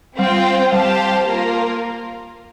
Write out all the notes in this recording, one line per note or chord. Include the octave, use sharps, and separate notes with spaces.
G3 C4 F4 C5 G5
G3 G4 C5 F5 A5
A#3 F4 A#4